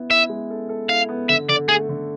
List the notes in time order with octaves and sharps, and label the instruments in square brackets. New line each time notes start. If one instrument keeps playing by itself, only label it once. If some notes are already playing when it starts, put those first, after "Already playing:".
Already playing: [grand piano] B3 E4
[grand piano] E4 [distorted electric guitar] E5
[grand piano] G#3
A4
A4
[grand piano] E4 [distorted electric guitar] F5
[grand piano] B3
[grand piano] D3 [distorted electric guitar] E5
[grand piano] D3 [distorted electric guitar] D5
[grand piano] A3 [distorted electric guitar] G#4
[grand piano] D3